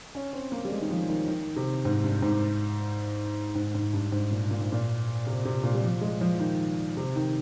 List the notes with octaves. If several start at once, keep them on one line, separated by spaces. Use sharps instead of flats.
C#4
C4
A#3
G3
G#3
D#3
F3
D#3
D#3
C3
G#2
G2
G#2
G#2
G#2
G2
G#2
A#2
A#2
G#2
A#2
C3
C3
A#2
G3
F3
G#3
F3
D#3
C3
D#3